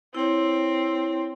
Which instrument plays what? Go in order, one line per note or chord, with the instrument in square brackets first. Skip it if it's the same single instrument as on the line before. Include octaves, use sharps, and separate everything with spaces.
[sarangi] C4 [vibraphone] E4 C#5